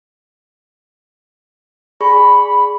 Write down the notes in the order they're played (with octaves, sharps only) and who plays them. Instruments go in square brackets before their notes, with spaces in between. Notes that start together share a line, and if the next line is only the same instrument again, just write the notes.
[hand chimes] G#4 D5 C#6 [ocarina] B5